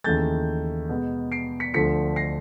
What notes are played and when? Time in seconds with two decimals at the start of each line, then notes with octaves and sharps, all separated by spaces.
0.04 D#2 C#3 E3 A3 G6 A6
0.89 B2 G#3 B3
1.32 C7 D7
1.60 B6 C#7
1.74 D2 D3 F3 A3 B6 C#7
2.16 A#6 C7